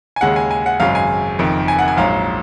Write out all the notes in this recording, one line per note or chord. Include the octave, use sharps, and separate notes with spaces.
G#5
D#2 C#3 G#3 F#5
G#5
G#5
F#5
G#1 F#2 C#3 G#3 F5
G#5
F#1 F2 D#3
G#5
F#5
G#5
A#1 G#2 F#3 F5